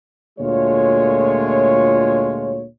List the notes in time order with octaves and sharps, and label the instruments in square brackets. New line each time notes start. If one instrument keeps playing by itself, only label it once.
[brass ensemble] D2 A#2 G#3 A3 F4 C#5